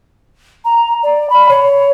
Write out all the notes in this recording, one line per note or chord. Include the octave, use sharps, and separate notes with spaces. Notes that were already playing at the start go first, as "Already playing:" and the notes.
A#5
D5
B5
C#5